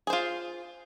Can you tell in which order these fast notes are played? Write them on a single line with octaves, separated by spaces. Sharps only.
G#4 C5 F4